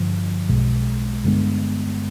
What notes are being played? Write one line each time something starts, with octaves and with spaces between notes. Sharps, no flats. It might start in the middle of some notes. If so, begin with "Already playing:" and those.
Already playing: G2 D3 F3
B1 B2 G#3
G2 D3 G#3 B3